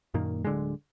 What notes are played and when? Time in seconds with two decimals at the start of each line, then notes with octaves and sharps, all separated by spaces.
0.14 F#2 A#2 D#3 A#3
0.45 D1 D3 G#3